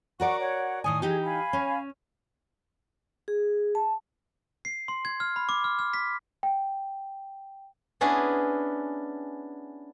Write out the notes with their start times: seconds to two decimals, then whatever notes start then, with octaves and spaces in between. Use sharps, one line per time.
0.20 F#4 A#4 D5 F#5 C#6
0.40 C#5 F#5
0.84 A2 D#3 G#5 D#6
1.02 E3 D#4 G4 G#4
1.24 F5 G#5 B5
1.53 C#4
3.28 G#4
3.75 A5
4.65 C7
4.88 C6
5.05 G#6
5.20 F6
5.36 B5
5.49 D6
5.64 F6
5.79 F6
5.94 B6
6.43 G5
8.01 B3 C#4 D4 E4 G#4 B4